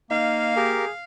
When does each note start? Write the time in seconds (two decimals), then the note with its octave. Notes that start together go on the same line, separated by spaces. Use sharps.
0.11 A#3 D#4 F5
0.56 G4 G#4 A#4